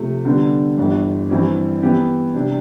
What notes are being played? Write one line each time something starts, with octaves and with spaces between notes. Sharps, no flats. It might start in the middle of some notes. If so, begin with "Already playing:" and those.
Already playing: C3 F3 A3
D3 G3 B3 D4 A4
G1 G2 E3
G2 E3 G3 C4 E4
E3 B3 E4 G4
C3 G3 D4 G4